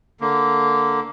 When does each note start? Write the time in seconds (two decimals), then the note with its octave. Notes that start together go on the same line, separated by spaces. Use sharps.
0.21 D3 A#3